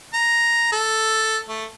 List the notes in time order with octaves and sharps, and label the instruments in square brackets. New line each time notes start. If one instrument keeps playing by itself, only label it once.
[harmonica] A#5
A4
A3